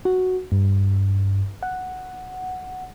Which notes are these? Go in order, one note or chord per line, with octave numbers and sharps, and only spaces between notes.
F#4
G2
F#5